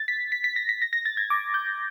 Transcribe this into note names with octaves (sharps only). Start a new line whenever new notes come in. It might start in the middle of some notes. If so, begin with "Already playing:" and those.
Already playing: A6
B6
B6
B6
A#6
B6
A#6
A#6
A6
G#6
D6
G6